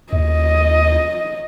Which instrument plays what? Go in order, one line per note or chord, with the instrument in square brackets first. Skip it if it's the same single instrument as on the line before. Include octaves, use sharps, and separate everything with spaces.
[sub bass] D#2 [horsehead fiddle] D#5